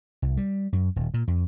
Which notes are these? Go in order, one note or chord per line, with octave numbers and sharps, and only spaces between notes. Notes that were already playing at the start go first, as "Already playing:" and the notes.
C2
G3
F#2
D#1
A#2
F2